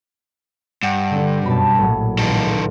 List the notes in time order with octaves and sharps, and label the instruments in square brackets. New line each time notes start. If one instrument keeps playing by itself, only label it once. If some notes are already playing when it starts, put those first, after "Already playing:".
[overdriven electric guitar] G2 [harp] F#5 E6 C#7
[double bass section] D3
[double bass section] F#2 B2 [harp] A5 B5
[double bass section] A#1 [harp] A2 F#3
[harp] E1 C#2 [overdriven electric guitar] D#3 A4